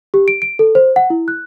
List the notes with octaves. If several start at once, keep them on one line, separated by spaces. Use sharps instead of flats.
G4
D7
D7
A4
C5
F#5
E4
F#6